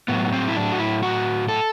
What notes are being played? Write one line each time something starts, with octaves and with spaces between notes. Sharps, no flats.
A2 F#3 B3
C4
E4
D4
F#4
E4
F#4
A4